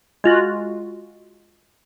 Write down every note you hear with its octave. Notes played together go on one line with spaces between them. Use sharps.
G#3 F4 F#4